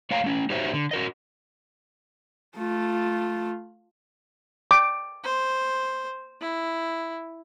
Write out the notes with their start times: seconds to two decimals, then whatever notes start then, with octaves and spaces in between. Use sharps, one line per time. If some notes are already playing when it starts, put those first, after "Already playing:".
0.11 A3 C#5 F5 G5 A#5
0.24 A3 C#4
0.50 D#4 F#4 G4 C5 C#5 E5
0.74 D3
0.91 F#4 A#4 D#5
2.57 A3 F4
4.71 D6
5.23 C5
6.41 E4